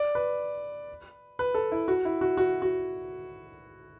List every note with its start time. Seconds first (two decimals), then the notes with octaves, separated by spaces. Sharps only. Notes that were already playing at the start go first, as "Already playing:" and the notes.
Already playing: D5
0.15 B4
1.39 B4
1.54 A4
1.72 E4
1.88 F#4
2.05 E4
2.21 F#4
2.37 F#4
2.62 F#4